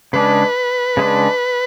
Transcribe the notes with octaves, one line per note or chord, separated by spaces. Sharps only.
C#3 G#3 D4 B4
C#3 G#3 D4